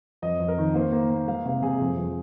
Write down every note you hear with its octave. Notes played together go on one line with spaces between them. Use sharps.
F2 D#5
F2
A#4
D#3
A#3 C5
A#3
A#3
G#3 F5
C3 F5
C3 G#4
F2
F2